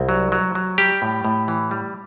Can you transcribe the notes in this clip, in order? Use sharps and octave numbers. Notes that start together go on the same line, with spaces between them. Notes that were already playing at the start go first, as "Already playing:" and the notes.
Already playing: C2
F#3
F#3
F#3
G3 G4
A2
A2
E3
G3